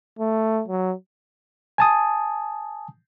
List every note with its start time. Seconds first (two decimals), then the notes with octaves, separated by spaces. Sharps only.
0.19 A3
0.68 F#3
1.78 G#5 A5 D#6